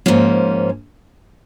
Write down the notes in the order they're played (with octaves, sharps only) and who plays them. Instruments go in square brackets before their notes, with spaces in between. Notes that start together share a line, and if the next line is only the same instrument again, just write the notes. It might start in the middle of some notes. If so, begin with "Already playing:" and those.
[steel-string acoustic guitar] G#2 F3 A#3 C#4